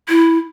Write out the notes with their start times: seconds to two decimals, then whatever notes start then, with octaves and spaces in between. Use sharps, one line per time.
0.09 E4